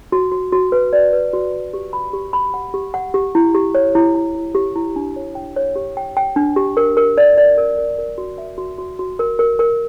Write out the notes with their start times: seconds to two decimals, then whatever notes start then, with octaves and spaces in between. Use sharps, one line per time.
0.12 F#4
0.32 F#4
0.52 F#4
0.72 B4
0.93 D5
1.13 B4
1.33 F#4
1.53 F#4
1.74 G4
1.93 B5
2.13 G4
2.33 B5
2.54 F#5
2.74 G4
2.94 F#5
3.14 G4
3.35 E4
3.55 G4
3.75 C#5
3.95 E4
4.15 E4
4.35 E4
4.55 G4
4.76 E4
4.96 D4
5.16 C#5
5.35 G5
5.56 C#5
5.76 G4
5.97 G5
6.17 G5
6.36 D4
6.56 G4
6.77 A#4
6.97 A#4
7.18 D5
7.38 D5
7.58 A#4
7.78 A#4
7.98 A#4
8.18 F#4
8.38 E5
8.58 F#4
8.78 F#4
8.99 F#4
9.19 A#4
9.39 A#4
9.59 A#4